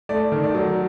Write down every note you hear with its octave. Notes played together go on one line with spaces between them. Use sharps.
A3 D5
D#3
D5
F#3